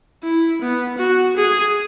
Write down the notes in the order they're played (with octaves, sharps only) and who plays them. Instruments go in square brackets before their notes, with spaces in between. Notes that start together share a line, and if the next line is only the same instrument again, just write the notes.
[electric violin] E4
B3
F#4
G#4